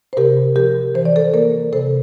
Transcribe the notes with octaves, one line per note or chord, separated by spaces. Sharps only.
C5
C3 G4 A#4
F3 G4 A#4
E3 C5
D5
A4 C5
A#3 A#4 D5
C3 A4 C5